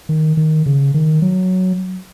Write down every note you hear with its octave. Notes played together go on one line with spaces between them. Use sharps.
D#3
D#3
C#3
D#3
F#3